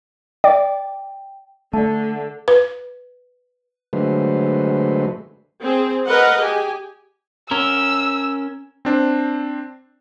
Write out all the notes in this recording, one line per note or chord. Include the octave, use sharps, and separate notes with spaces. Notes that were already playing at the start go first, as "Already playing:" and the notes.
D5 G5
D3 A3 D5 A5
B4
D3 F#3 G#3 A3 B4 C5
C4 G#4
A#4 B4 D#5 F#5
G4 G#4 G#5
C#4 A#4 E6
C4 D4 C5